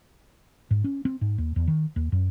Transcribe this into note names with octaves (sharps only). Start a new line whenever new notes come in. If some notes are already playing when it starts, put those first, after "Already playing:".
G#2
C#4
C4
G#2
D#2
E2
D#3
D#2
F#2